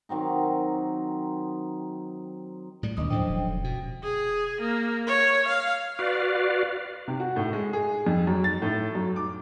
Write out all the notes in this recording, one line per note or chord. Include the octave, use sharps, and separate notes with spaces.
D#3 F#3 C4 D#4
A2 G3
D#1 D#2 D#3 D4 D#5 D#6
F#2 A2 D3 F3 C5 G5
E1
B2
G#4
A#3
C#5
F5
F#4 B4 D5 F5
C3
F#4
A2
G#3
G#4
F2
F#2
A6
A2
F#2
D6